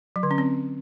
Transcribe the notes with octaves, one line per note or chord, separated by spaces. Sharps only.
F#3
D3
C#4
C4